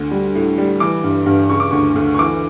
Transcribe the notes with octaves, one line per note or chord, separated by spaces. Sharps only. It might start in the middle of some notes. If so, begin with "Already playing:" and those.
Already playing: D2
G3
A2
G3
E3 D6
G2
G2
C#3 C#6
D6
D2 C#6
D2
C#6
E3 D6